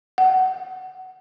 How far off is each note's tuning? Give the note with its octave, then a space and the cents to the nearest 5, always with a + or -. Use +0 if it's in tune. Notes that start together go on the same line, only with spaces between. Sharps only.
F#5 +25